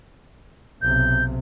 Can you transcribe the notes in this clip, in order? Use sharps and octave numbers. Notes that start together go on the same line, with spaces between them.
B1 C3 G6